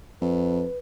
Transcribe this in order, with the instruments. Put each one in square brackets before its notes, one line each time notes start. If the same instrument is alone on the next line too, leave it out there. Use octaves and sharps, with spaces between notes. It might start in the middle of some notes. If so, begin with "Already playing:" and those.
[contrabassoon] F2 [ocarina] B4